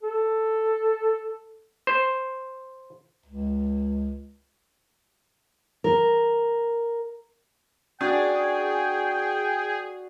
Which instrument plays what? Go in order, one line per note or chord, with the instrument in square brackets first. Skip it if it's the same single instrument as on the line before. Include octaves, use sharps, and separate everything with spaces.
[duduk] A4
[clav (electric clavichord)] C5
[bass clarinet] C#2
[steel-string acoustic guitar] A#4
[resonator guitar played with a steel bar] D4 [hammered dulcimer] F#4 D5 [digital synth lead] G#4 [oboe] G5